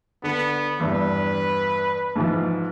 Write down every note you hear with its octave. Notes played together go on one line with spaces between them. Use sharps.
D3 B3
E2 G2 B4
G#2 E3 F3